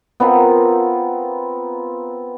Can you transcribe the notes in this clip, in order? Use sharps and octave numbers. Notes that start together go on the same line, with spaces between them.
B3 C4 F4 A#4